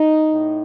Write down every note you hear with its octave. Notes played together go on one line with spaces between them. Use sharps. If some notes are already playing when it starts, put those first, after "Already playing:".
Already playing: D#4
A2